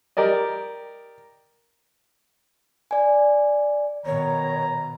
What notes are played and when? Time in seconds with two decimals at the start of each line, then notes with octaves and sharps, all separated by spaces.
0.17 G4 A#4 D5 D#5
2.91 D5 G#5
4.06 B2 D#3 C#5 A#5